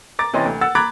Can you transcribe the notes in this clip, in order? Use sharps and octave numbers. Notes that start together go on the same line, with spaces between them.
A#5 D6 A6
C3 E3 C#4 D#5 C6
D2
F#5 E6 A6
A#5 B5 D6 F#6 G#6 A6